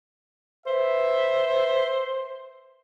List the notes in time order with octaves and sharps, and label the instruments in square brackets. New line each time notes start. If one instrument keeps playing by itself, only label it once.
[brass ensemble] B4 E5 [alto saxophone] C5